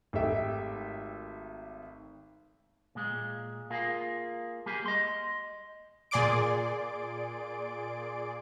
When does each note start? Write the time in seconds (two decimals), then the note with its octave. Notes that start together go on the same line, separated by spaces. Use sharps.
0.13 G#1 A3 G4 A4 E5 G5
2.95 A#2 G#3
3.70 A#3 F4 G#4
4.66 G3 A#3 G4 G#4
4.86 D#5 C6
6.11 A#2 G#4 D5 C6 D6 D7